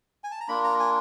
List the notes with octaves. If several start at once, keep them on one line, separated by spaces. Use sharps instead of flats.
G#5
A5
A#5
A#3 D4 F4 B5
A#5
G#5